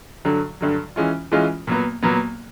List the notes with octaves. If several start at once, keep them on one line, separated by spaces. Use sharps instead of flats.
G2 D3 F#3
G2 D3 F#3
E3 G#3 C#4 F4
E3 G#3 C#4 F4
A#2 F#3 B3
A#2 F#3 B3